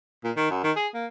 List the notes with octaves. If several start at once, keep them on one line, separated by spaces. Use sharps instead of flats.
A#2
D#3
F#2
D#3
G#4
A#3